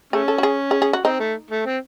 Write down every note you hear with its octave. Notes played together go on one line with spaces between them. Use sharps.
A3 C#4 G#4
A4
F#4
G#4
G#4
G#4
F#4
C4 D#4
A3
A3
C4